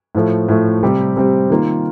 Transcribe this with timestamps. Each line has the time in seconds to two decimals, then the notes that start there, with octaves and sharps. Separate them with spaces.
0.15 A2 F3 A3
0.49 A2 F3 A3
0.83 C3 G3 C4 G4
1.16 C3 G3 C4 G4
1.50 D#3 A#3 F4